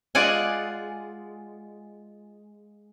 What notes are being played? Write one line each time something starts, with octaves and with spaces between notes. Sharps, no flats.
G#3 F4 D5 F#5 G#5